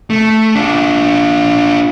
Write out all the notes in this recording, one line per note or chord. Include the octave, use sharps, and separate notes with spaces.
A3
D4 F4